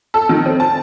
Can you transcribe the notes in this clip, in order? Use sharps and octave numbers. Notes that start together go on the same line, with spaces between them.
A4
D#3
C4
A5